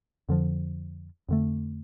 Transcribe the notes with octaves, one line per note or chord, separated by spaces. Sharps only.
F2 D3 F3
F2 D3 A3